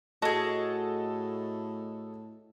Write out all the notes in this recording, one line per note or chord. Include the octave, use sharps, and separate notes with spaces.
A2 F#4 G#4 A4 D#5 A5